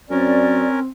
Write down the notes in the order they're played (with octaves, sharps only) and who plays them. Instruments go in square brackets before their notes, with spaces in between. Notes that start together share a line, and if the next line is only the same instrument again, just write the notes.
[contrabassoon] F#2 [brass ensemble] C4 [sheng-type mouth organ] C#4 A#4 [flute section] D5